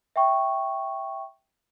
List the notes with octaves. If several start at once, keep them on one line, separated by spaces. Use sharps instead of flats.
E5 G5 C#6